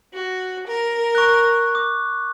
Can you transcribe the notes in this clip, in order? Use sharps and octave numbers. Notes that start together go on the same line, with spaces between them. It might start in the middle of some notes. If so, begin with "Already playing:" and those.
F#4
A#4
C#6 F#6
D6